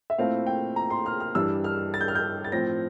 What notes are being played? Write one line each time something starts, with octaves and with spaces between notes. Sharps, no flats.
E5
A#2 A3 C4 E4 F5
G5
A#5
C6
F6
F6
G2 E3 G3 D4 E6
F6
A6
G6
F6
G6
A6
A2 F3 C4 A#6